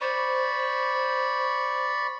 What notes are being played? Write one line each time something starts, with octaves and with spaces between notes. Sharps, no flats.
C5 D5 B5 C#6